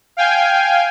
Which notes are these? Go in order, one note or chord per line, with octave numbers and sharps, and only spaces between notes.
F5 G5 G#5